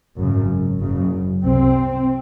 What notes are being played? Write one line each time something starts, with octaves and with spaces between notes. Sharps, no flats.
G#1 F#2 C#3
F#1 F#2 C#3
C2 C3 C4